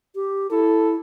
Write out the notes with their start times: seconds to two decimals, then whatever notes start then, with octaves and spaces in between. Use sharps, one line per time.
0.15 G4
0.51 E4 A4